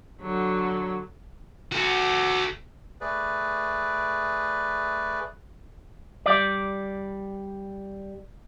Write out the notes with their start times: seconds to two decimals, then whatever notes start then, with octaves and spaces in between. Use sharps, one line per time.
0.21 D3 F#3
1.72 F#4 A4
3.01 A3 G#4 B4 D5
6.26 G3 D5